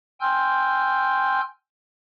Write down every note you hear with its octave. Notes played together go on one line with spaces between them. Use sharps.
G5 G#5 C6 E6 F6 G6